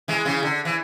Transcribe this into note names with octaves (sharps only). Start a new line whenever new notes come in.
E3 G#3
C#3 E3
D3
E3